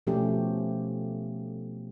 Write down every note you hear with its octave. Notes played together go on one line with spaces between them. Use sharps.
B2 F3 A3 C#4 G4